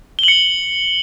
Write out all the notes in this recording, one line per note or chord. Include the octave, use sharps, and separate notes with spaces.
C#7 F#7 G7